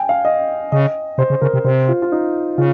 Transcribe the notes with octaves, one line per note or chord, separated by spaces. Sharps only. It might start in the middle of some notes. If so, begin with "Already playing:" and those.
Already playing: G5 G#5
F5
D#5
C#3 D#5
C3 C5
C#3
C#3 A#4
C3
C3 C5
F4
F4
D#4
C#3 F4